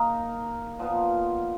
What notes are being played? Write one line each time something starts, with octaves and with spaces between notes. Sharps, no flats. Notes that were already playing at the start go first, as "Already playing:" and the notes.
Already playing: A#3 D#4 A#4
A#2 F3 B3 F4